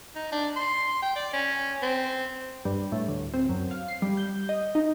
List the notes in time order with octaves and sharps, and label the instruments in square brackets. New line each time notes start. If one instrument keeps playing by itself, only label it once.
[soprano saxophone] D#4
D4
C6
G5
D5
C#4
C4
[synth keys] G2
A2
D2
C4
F#2
F5
C7
G3
G6
D#5
D#4